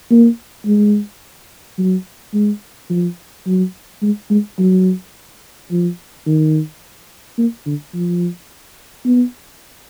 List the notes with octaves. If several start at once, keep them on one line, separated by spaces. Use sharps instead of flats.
A#3
G#3
F#3
G#3
F3
F#3
G#3
G#3
F#3
F3
D#3
A#3
D3
F3
B3